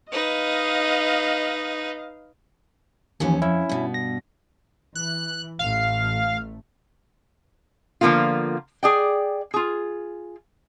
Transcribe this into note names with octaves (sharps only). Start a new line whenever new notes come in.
D#4 B4 D#5 F5
D#2 E3 F3 C#4
F2 C#4 E4
G2 B2
A#6
E3 F#6
A1 A3 F5
D3 F3 A#3 B3 F4
G#4 D5 G5
F4 G#4